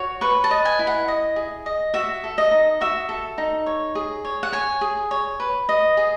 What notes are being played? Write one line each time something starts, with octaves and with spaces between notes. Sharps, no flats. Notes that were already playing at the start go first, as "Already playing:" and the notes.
Already playing: F#4 C#5
B4 C#6
A5
D#5
G#5
E4
F#5
D#5
G#4
D#5
F#4 E5
A4
D#5
D#4
F#4 E5
A4
D#4
C#5
G#4
C#5
F#5
C#5 G#5
G#4
C#5
B4
D#5
G#4